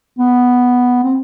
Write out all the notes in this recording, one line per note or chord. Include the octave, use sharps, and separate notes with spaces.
B3
C4